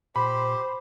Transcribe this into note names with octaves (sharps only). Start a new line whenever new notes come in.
A#2 G4 C5 B5